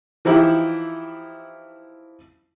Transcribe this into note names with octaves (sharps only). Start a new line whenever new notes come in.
E3 F3 D#4 E4 G4